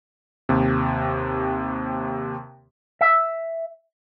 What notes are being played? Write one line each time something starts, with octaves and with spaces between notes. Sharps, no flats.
D#2 C3
E5